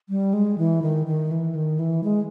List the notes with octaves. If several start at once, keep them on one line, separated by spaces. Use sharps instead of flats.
G3
G#3
E3
D#3
D#3
E3
D#3
E3
G#3